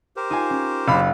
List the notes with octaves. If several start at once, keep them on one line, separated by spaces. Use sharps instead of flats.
G4 A#4 C5
D#4 F4 G#5
C#4
F#1 F5 B5